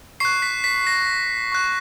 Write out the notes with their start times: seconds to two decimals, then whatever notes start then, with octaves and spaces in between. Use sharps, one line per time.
0.20 C#6 F#6 C7
0.42 B6
0.64 B6
0.87 A#6
1.52 C#6 F#6